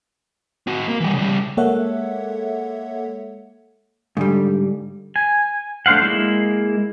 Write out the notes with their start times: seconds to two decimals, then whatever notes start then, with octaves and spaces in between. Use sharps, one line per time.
0.67 C4 F#4
0.88 A#3
1.00 E3 G3
1.14 C#3 G3
1.57 G#3 A#3 A4 C#5 E5 F#5
4.17 G#2 D3 G3
5.16 G#5
5.86 A3 D4 C5 F5 F#5
6.02 G#3 A#3 E4